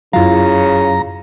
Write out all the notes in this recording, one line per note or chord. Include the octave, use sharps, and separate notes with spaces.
F#2 C#3 F#3 E4 F4 F5 A#5